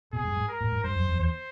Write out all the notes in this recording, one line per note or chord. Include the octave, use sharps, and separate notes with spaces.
B2 G#4
G2
G#2
A#4
A2
G#2
G2 C5
F#2
F2
E2 C5